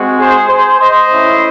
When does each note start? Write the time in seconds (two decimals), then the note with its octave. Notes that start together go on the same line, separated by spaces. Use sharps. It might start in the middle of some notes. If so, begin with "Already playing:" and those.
Already playing: G#3 C4 F#4
0.20 G#4 C5
0.49 G#4 C5
0.80 C5 D#5
1.11 A3 C#4 E4